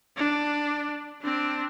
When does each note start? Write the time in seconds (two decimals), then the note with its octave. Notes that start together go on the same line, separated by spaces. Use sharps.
0.17 D4
1.22 C4 D4